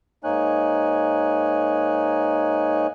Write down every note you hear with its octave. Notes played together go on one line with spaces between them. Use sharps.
G#2 A#3 D#4 C#5 G#5 F#6